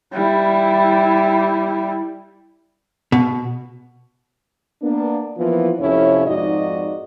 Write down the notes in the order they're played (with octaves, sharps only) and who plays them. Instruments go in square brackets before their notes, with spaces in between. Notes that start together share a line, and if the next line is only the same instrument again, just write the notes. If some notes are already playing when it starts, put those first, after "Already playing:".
[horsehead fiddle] G3 E4
[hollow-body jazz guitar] B2
[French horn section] A#3 B3 D4
E3 F3 A#3 B3 F4
F2 A2 C3 C#4 E4 C#5
F2 G#2 D#4 F#4 D5 D#5